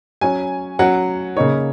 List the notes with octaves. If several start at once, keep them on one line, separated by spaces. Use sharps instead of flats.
F#3 C#4 G#5
F#3 C#4 F#5
C#3 A#3 D#4 C#5